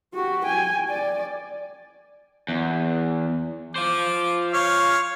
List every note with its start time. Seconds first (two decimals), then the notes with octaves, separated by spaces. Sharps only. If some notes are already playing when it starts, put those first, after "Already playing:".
0.14 F#4 G4
0.46 G5 G#5
0.90 D5
2.48 E2
3.76 F4 C5 D6
4.54 C#5 F5